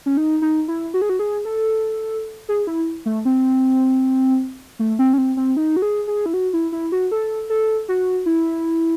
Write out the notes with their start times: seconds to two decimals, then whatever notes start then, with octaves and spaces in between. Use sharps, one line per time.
0.06 C#4
0.17 D#4
0.42 D#4
0.68 E4
0.94 F#4
1.02 G#4
1.09 F#4
1.19 G#4
1.45 A4
2.49 G#4
2.67 E4
3.06 A3
3.25 C4
4.79 A3
4.99 C4
5.13 C#4
5.18 C4
5.37 C4
5.57 D#4
5.76 F#4
5.82 G#4
6.07 G#4
6.26 E4
6.34 F#4
6.53 E4
6.72 E4
6.92 F#4
7.11 A4
7.50 A4
7.89 F#4
8.26 E4